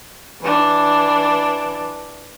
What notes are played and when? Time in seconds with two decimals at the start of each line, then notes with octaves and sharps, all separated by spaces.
0.42 E3 D4